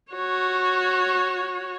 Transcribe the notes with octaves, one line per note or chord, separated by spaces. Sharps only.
F#4 C#5